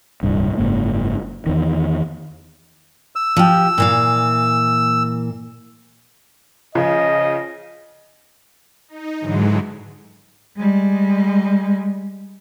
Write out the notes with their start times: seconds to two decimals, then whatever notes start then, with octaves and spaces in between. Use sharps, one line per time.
0.23 D1 C2 G2
0.58 F#1 G#2 A#3
1.46 E2 D#3
3.15 E6
3.37 F3 G4
3.78 A#2 E3 F5
6.75 C#3 F3 D#5
8.88 D#4
9.20 G#2 D3 E3 F#3 G#3
10.57 G3 G#3